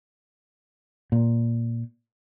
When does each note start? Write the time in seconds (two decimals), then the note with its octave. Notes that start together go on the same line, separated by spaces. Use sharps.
1.12 A#2